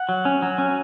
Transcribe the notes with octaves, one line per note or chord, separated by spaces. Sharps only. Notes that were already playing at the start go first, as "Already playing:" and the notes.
Already playing: F#5
F#3
C#4
F#3
C#4